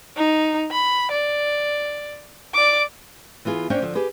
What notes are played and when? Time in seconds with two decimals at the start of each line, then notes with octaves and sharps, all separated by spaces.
0.17 D#4
0.71 B5
1.12 D5
2.54 D5 D6
3.45 E3 B3 F4 G#4
3.70 A#3 C#4 D4 C5 C#5 G5
3.82 D3 F3
3.95 G4 G#4 B4